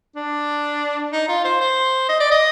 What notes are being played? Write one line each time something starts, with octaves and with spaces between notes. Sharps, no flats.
D4
D#4
F4
C5
C5
D#5
D5
D#5